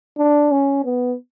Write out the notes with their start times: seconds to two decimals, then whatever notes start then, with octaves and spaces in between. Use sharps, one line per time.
0.18 D4
0.52 C#4
0.85 B3